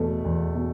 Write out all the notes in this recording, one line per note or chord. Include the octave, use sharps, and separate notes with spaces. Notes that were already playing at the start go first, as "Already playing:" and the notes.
Already playing: E2 B2 A3
E2
B2